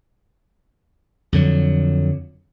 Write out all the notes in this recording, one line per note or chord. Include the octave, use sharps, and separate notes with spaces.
F2 D3 F#3